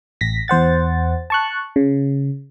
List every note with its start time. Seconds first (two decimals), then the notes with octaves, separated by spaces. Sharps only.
0.21 A1 A#6 B6
0.48 E2 C5 F#5 A6
1.30 A5 C#6 F#6
1.76 C#3